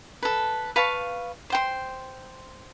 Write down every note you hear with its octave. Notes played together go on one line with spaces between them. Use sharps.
A4 B4
B4 F5 A5 C#6
C5 G5 C6